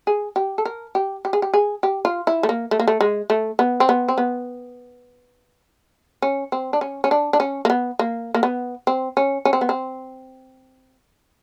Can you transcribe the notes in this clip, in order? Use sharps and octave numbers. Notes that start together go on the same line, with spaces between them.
G#4
G4
A4
A#4
G4
G4
G#4
G4
G#4
G4
F4
E4
A3
A#3
A3
A#3
A3
G#3
A3
B3
C4
B3
C4
B3
C#4
C4
D4
C#4
C#4
D4
D4
C#4
A#3
B3
A#3
A#3
B3
C4
C#4
C#4
C4
B3
C4